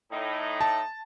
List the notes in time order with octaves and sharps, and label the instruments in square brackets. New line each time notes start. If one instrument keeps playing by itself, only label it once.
[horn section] A2 D#4
[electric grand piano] A5